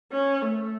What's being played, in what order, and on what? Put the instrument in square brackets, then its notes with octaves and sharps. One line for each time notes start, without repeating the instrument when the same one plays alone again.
[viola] C#4
A3